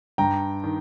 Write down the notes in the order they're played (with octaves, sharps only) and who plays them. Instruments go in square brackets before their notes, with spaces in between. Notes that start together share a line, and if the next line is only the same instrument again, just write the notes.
[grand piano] G2 G5 A#5
D#3